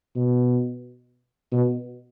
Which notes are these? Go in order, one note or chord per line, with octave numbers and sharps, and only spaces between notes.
B2
B2